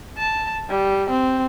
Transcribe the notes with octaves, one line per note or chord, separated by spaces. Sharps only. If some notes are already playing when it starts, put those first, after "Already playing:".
A5
G3
C4